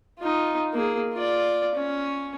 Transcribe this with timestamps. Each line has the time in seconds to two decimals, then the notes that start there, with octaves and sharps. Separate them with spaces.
0.19 D#4 F4
0.73 A#3 G#4
1.13 F4 D5
1.75 C#4